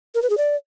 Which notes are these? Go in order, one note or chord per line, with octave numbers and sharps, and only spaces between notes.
A#4
B4
G#4
D5